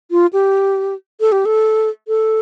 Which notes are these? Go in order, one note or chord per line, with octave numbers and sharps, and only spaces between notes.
F4
G4
A4
G4
A4
A4